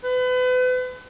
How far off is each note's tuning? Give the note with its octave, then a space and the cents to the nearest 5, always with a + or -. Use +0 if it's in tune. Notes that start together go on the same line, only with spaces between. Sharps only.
B4 +35